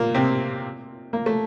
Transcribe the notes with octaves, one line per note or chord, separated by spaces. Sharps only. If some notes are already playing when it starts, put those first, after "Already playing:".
Already playing: A#2 A#3
C3 C4
A#3
A3